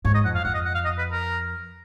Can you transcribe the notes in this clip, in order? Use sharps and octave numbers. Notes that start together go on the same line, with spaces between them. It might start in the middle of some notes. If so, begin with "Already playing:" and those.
G#2 C#5
D#5
F2 F#5
F5
F2 F#5
D#5
F#5
F5
D#5
B4
A#4